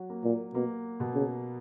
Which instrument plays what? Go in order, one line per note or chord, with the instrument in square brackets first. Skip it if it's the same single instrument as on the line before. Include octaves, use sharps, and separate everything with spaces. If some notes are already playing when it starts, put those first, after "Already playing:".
Already playing: [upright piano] F#3
A#3
[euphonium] A#2
[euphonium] B2 [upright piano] A#3
[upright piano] B2
[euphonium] C#3